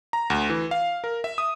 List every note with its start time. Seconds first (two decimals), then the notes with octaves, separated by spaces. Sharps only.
0.13 A#5
0.30 D2
0.49 E3
0.71 F5
1.04 A#4
1.24 E5
1.38 D#6